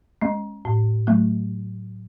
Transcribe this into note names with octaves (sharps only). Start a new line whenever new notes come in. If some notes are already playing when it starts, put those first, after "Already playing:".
G#3 C#4
A2
F#3 A3